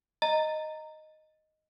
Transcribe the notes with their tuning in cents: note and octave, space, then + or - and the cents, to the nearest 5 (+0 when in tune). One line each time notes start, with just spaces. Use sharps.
D#5 +0 A#5 -15